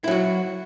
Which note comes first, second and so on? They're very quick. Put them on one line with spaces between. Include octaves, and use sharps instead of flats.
E4 F#3 F#4